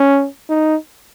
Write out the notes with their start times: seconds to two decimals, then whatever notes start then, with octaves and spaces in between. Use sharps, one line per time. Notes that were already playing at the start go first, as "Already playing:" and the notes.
Already playing: C#4
0.49 D#4